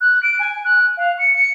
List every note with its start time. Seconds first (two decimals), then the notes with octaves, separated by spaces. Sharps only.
0.01 F#6
0.23 D7
0.39 G#5
0.65 F#6
0.97 F5
1.19 C#7
1.34 C#7